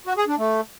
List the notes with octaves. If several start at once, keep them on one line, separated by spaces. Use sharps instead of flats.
F#4
G#4
D4
A3